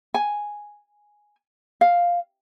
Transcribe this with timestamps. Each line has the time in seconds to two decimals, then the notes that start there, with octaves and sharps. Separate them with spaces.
0.14 G#5
1.81 F5